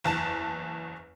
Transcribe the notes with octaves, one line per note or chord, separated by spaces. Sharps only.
F#1 E2 A5 E7